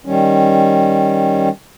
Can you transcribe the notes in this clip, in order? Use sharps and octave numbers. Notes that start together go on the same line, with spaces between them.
D#3 G3 C#4